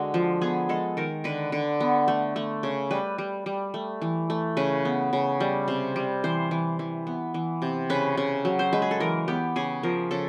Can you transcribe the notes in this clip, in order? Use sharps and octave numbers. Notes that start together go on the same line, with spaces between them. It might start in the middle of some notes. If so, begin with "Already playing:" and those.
Already playing: D3 G#3 F#4
F3
B3 G#4
G#3 A4
D#3 A#4
D3 B4
D3
B3
A3
A3
C#3
G3 B4
G3
G3
A3
E3
A3
C#3 B4
B3
C#3
G3
C3
G3
E3 C5
E3
E3
B3
E3
C3
C#3 B4
C#3
F#3
C5
G#3 B4
G#4
A4
E3 A#4
B3 G4
C#3 G#4
F3 A#4
C#3 A4